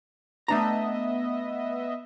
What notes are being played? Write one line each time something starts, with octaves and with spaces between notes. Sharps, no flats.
A3 B3 D4 D#5 E5 A#5